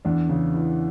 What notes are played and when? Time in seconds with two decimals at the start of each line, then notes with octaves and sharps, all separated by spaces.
0.05 E2 D4
0.29 C#3
0.54 E3